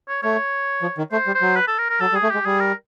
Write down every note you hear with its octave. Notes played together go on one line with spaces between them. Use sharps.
C#5
A3 C#5
F3
D#3
A3 C5
G3
C5
F#3
B4
A4
A#4
A#4
F#3 A4
G3
G#4
A3
G#3 G4
G3 G#4
A#4